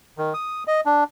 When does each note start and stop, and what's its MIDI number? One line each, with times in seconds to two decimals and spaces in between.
0.18 0.33 51
0.34 0.64 87
0.67 0.81 75
0.86 1.04 62